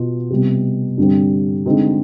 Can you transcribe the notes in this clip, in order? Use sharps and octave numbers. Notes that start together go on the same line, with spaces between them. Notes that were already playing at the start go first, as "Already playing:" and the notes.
Already playing: B2 B3 F4
C3 G3 B3
G2 D3 G3 C4
D3 G#3 C4 D#4